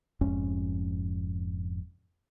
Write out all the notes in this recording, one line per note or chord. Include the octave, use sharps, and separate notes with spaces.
F1 F2 G#2 C#4